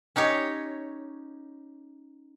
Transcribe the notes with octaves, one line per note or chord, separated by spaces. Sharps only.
C#4 D#4 G4 C#5